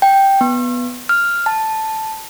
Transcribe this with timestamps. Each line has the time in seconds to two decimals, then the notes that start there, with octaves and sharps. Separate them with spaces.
0.02 G5
0.41 B3
1.09 F6
1.46 A5